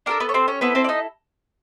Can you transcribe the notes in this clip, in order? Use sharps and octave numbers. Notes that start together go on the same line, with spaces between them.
D4 F4 A4 A#4
B3 B4
C#5
C4 C5
C#4 C#5
B3 C4 E4 A4 B4
C4 C5
D5
D#4 D#5